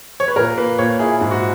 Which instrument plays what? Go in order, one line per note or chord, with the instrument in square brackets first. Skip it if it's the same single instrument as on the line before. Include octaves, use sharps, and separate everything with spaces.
[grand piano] C#5
B4
A#2 A#4
A#3 B4
A#2 C#5
E4 G#4
G#2 G#4
F#4